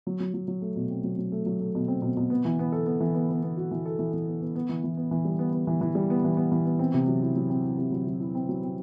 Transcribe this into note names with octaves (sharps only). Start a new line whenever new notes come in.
F#3
F#3
F#3
F#3
A3
B2
C4
F#3
F#3
A3
F#3
A3
B2
C4
B2
B2
B3
E3
B3
A4
B3
E3
B3
B3
B3
F#4
E3
A4
E3
E3
B3
B3
B3
E3
E3
B3
E3
G3
B3
B3
E3
E3
G3
B3
E3
B3
E3
B3
C4
C3
F#3
E4
F#3
C4
E4
C3
F#3
F#3
E4
C4
F#3
C4